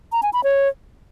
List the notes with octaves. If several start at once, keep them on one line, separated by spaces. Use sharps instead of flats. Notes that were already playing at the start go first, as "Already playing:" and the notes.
A#5
G#5
B5
C#5